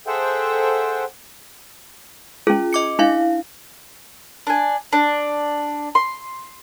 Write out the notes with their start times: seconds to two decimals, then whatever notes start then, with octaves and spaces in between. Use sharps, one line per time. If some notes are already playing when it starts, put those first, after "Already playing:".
0.07 G#4 A4 C5 E5 F#5 G5
2.47 C#4 F4 G#4
2.73 D#5 D6 C#7
2.99 D4 E4 F5
4.47 D4 G#5
4.93 D4
5.95 C6